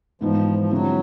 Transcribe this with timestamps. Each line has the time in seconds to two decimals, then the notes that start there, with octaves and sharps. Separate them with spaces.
0.21 G#2 E3 F3 G#3 B3 D#4
0.59 F3
0.71 D3 F3 F#3 G#3 C4 E4